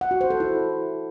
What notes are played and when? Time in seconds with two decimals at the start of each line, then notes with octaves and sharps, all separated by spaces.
0.01 F#5
0.11 F#4
0.21 C5
0.30 A4
0.40 E4